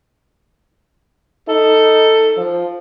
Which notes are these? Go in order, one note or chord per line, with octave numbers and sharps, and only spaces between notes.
D#4 A4
F3